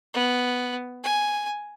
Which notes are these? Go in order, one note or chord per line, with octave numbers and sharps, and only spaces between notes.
B3
G#5